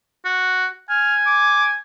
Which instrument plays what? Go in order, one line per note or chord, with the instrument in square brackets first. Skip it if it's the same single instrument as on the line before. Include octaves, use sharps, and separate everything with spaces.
[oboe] F#4
[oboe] G#5 [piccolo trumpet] F6
[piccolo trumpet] D6